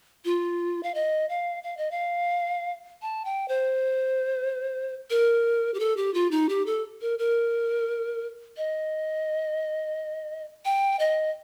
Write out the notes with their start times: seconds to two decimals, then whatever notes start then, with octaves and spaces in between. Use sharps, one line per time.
0.25 F4
0.83 F5
0.95 D#5
1.29 F5
1.63 F5
1.77 D#5
1.91 F5
3.02 A5
3.25 G5
3.48 C5
5.10 A#4
5.74 G4
5.80 A4
5.97 G4
6.14 F4
6.31 D#4
6.49 G4
6.66 A4
7.01 A#4
7.19 A#4
8.57 D#5
10.65 G5
10.99 D#5